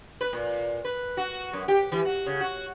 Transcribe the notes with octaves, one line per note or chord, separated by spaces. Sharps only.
B4
A#2
B4
F#4
F#2
G4
E3
F#4
C#3
F#4